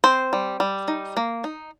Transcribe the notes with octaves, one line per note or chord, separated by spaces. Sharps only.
C4 C5
G3
G3
D#4
A#3
D#4